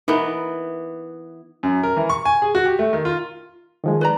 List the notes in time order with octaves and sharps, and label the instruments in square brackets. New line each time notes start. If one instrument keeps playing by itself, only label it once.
[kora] E3 B3 [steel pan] D#4 A#4
[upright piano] F#2
A#4
E3
C#6
G#5
G#4
F#4
G4
A3
D#3
F4
[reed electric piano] D#3 F3 G#3
[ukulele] B4 D5 A#5